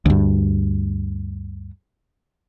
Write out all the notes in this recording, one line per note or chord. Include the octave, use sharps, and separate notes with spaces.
D2 G2